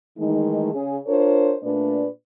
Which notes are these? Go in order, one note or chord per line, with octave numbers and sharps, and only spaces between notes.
D#3 E3 G#3 A3 D#4
C#3 G#4
D4 F4 A#4 C5 C#5
A#2 A3 D4 B4 D5